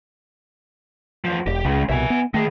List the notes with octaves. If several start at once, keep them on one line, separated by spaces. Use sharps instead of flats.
E2 F3
E1 G4
C#2 C#3 G#3
C2 B2 E5 G#5
B3
D#3 A3 G#4